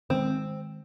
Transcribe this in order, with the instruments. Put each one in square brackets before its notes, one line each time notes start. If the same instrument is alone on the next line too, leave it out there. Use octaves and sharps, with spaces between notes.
[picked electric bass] D#3 G#3 [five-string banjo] C4